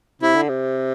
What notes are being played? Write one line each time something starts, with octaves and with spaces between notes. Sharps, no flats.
C3 E4
D3
C3